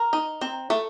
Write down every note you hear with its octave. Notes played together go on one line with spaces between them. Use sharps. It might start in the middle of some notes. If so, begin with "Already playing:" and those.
Already playing: A#4
D#4
C4
A3